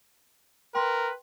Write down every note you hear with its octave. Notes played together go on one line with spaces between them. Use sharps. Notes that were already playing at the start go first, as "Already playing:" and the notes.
A#4 B4 G5 C6